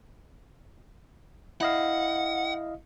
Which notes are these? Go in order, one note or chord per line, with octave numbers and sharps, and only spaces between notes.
E4 D#5 F5 F#5